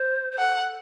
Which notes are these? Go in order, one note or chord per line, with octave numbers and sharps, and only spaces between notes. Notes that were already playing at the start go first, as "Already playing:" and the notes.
Already playing: C5
C5
A4 F#5